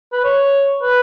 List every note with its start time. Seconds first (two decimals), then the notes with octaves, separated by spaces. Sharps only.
0.13 B4
0.24 C#5
0.82 B4